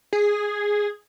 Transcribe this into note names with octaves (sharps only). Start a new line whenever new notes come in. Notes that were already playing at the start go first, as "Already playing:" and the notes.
G#4